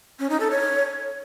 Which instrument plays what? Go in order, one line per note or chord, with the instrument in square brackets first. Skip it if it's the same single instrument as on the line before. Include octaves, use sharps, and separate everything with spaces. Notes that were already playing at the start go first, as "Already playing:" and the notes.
[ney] C#4
D#4
A4
C#5